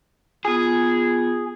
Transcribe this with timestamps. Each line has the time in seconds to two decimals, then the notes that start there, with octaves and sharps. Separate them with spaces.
0.45 B3 F4 G#4